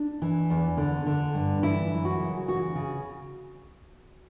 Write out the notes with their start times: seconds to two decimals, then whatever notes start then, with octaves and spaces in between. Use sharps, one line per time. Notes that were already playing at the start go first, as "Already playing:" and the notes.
Already playing: D4
0.22 E3
0.50 E2
0.77 D3
1.07 D3
1.34 G2
1.62 E3 E4
1.90 F#2
2.05 F#4
2.19 C#3
2.48 E3 F#4
2.75 C#3